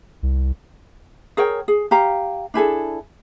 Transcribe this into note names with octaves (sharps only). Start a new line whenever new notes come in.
C2
G#4 A#4 C#5 G5
G#4
G4 F5 A#5
D4 E4 G#4 A4